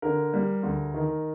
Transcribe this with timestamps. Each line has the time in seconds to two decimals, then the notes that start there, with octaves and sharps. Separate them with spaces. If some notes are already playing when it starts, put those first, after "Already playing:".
0.02 D3 A#4
0.34 G3
0.63 D2
0.94 D#3